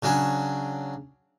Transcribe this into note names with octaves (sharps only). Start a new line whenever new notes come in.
C#3 F#3 D4 G#4